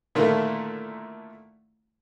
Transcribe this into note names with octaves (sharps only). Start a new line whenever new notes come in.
A#2 D3 D#3 A3 E4 F4